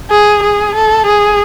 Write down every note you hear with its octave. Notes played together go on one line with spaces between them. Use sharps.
G#4
G#4
A4
G#4